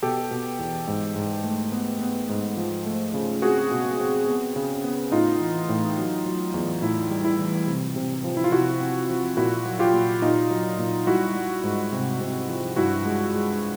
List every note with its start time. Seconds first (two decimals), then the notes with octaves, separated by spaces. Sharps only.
0.02 B2 G4 A4
0.31 B2
0.59 E2
0.87 G#2
1.16 G#2
1.44 A3
1.72 B3
2.00 B3
2.29 G#2
2.57 F3
2.86 A3
3.14 C#3
3.42 C4 F#4 G#4
3.71 B2
3.99 C4
4.27 B3
4.56 C#3
4.84 B3
5.12 A2 D#4 F4
5.40 E3
5.69 A2
5.98 F#3
6.26 F#3
6.54 E2
6.82 A2 E4
7.11 G3
7.25 E4
7.39 E3
7.67 C3
7.96 C3
8.24 F3
8.37 E4
8.44 F4
8.52 C3 E4 F#4
8.80 C4
9.09 F3
9.37 A#2 E4 F#4
9.66 F#3
9.79 F4 G4
9.94 A#2
10.22 A#2 D#4 F4
10.50 F#3
10.78 A#2
11.07 G3 E4 F#4
11.35 G3
11.64 G#2
11.93 C3
12.21 C3
12.49 F3
12.76 G2 E4 F#4
13.05 G#3
13.34 G#3